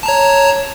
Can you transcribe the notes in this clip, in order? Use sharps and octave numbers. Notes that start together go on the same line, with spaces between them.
C#5 A5 A#5